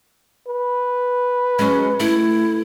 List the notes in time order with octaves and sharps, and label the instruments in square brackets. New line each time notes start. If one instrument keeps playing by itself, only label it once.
[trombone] B4
[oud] F#3 G#3 [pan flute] C#4
[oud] A3 [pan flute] E4